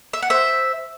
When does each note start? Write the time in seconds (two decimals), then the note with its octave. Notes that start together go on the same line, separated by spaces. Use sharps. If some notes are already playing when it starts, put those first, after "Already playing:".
0.13 E5
0.22 F#5
0.30 C5 E5